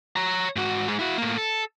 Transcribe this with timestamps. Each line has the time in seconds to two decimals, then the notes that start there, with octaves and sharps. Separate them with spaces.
0.16 C#5 A#5
0.56 G#2 F#4
0.88 G#2 G#3
0.99 E4 F#4
1.18 A2 A#3
1.38 A4